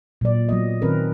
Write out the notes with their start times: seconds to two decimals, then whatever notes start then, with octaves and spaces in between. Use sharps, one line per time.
0.21 A#2 F#3 D5
0.49 F#3 B3 D#5
0.82 D#3 C4 C#4 A#4 B4